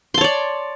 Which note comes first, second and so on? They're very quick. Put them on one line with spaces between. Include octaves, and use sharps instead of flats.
C6 A5 C#5 D5